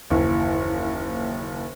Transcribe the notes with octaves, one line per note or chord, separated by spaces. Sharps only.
F#1 D#2 E3